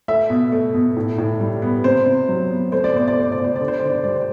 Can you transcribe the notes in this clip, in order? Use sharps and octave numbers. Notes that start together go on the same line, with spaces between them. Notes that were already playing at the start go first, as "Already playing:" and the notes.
A3 E5
B2
A3
B2
A2
A2
G3
B3
C3 C5
C3
F#3
B3
A3 C5
D5
B2 C5
D5
A3 C5
D5
B2
C5
D3 D5
C5
D3 D5
C5
G3 D5
C5